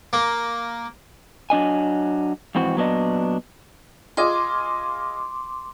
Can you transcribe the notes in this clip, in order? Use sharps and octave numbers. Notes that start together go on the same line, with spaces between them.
A#3
F#3 D4 D#5 G#5
F2 G#2 E3 C4 F#4
A#2 F#3 B3 D4 D#5
F4 G#4 D#5 C6 D6